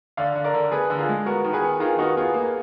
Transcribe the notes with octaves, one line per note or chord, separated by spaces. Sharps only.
D3 D5 F5
D3
A#4 D5
D3
B3 G#4 B4
D3 A#4
F4 G#4
G#3
B3 F#4 A#4
D#3
G#4 B4
B3
D#3 F4 G#4
B3 D#4 F#4
B3 F4 G#4
A#3